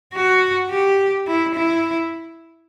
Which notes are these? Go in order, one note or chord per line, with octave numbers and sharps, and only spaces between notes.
F#4
G4
E4
E4